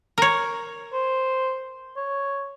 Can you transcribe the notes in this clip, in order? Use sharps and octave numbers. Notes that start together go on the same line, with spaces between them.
A#4 C#5
C5
C#5